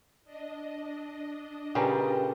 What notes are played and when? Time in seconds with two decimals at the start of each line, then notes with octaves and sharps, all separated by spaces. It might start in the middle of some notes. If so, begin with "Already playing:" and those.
0.24 D4 D#5
1.75 A#2 C#3 G3 G4 B4 G5 A#5